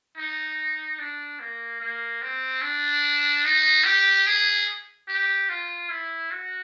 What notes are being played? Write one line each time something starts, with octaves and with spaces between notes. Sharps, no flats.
D#4
D4
A#3
A#3
C4
D4
D#4
G4
G#4
G4
F4
E4
F#4